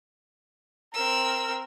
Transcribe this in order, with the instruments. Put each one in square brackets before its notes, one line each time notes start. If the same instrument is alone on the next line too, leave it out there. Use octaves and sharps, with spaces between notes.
[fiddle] C4 E6 [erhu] A#4